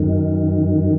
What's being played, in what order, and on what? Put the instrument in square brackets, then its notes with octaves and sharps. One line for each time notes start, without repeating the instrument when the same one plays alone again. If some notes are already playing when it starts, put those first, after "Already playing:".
Already playing: [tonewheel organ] F#2 D#3